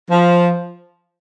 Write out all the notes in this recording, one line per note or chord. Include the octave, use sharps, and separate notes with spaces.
F3